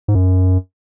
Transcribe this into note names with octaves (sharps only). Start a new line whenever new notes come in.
G#2
F#2